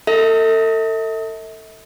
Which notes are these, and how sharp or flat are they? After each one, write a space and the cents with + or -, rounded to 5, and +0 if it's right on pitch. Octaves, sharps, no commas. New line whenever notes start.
A4 +35 E5 -45